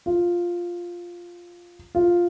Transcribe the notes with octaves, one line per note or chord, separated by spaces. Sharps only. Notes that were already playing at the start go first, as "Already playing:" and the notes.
F4
F4